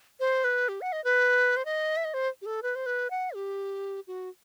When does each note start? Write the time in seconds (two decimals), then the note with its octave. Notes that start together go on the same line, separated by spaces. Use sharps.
0.20 C5
0.44 B4
0.69 G4
0.81 F#5
0.92 D#5
1.04 B4
1.57 C5
1.65 D#5
1.97 E5
2.05 D#5
2.14 C5
2.42 G4
2.46 A4
2.63 B4
2.75 C5
2.86 B4
3.11 F#5
3.35 G4
4.07 F#4